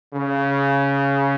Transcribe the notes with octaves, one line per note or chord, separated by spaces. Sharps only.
C#3